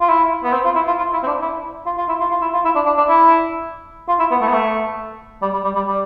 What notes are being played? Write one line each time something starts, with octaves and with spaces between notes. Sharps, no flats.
F4
E4
B3
C4
F4
E4
F4
F4
E4
C4
D4
E4
F4
F4
E4
F4
F4
E4
F4
E4
D4
D4
D4
E4
F4
E4
B3
A3
B3
A3
G3
G3
G3
G3
G3